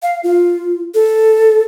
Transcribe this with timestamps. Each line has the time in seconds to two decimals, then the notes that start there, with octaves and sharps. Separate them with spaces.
0.03 F5
0.23 F4
0.94 A4